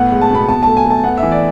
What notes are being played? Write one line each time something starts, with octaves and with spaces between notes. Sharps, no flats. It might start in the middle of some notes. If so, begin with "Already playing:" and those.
Already playing: A2 B3 F#5
G#3
A5
B2 B5
B2 A5
A3 A5
G#5
A3 A5
B3 F#5
E5
E3
D5